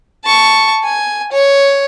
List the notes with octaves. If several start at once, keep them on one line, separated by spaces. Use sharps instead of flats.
A5 C#6
G#5
C#5